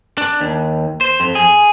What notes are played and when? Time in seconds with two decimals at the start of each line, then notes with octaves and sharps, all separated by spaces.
0.18 D4
0.40 D#2
1.01 C5
1.20 F2
1.35 G#4